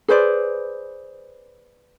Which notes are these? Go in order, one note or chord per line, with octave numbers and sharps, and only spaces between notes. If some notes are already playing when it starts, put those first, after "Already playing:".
G#4 B4 C5 D5